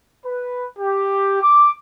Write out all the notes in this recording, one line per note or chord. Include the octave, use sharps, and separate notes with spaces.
B4
G4
D6